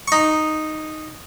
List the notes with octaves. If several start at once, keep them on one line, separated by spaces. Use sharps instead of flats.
D#4 C#6